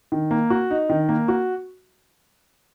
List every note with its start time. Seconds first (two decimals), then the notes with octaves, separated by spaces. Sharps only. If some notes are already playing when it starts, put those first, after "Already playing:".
0.12 D#3
0.31 A#3
0.50 F#4
0.70 D#4
0.90 D#3
1.09 A#3
1.28 F#4